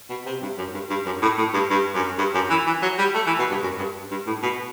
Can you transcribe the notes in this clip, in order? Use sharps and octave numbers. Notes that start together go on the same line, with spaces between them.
B2
C3
G2
F#2
G2
G2
F#2
A2
A2
G2
G2
F#2
G2
F#2
E3
E3
F#3
G3
A3
E3
B2
G2
F#2
G2
G2
A2
B2